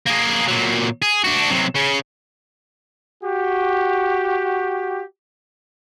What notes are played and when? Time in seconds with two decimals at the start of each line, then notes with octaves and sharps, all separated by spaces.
0.07 A#3 G#4
0.48 A#2 F#3
1.02 G#4
1.24 D4 F#4
1.50 C3 F#3
1.76 C#3 C#4
3.24 F#4 G4